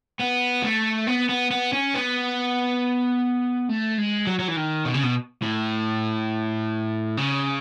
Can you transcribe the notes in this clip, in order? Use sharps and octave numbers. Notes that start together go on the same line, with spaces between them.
B3
A3
B3
B3
B3
C#4
B3
A3
G#3
F#3
F#3
E3
D#3
B2
C#3
B2
A2
C#3